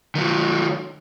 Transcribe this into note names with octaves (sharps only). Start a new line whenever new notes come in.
D#3 F#3